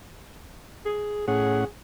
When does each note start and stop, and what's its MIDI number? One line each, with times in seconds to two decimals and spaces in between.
0.85 1.24 68
1.28 1.65 45
1.28 1.65 61
1.28 1.65 68
1.28 1.65 78